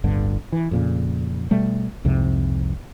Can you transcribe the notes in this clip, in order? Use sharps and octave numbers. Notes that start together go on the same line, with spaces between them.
D1 G1 G2 D3
E3
F2 A#2 C#3
B2 G3 A3
C2 F2 G#2 C3